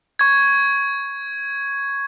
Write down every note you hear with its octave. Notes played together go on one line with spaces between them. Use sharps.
C#6 G#6